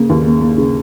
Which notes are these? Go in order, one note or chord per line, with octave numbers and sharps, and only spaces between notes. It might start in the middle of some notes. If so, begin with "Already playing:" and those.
Already playing: C#3 A#3
D#2
A#3
A#3
C#3